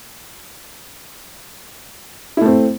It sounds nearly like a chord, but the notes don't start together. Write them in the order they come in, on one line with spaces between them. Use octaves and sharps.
E4 A3 C4